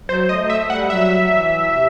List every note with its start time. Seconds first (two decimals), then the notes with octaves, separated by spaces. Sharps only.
0.09 F#3 C5
0.29 A3 D#5
0.50 A3 E5
0.70 G3 F#5
0.90 F#3 E5
1.31 E3
1.71 C3